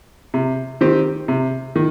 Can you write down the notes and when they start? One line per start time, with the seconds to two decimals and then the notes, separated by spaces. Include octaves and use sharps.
0.34 C3
0.81 D#3 C4 G4
1.28 C3
1.76 D#3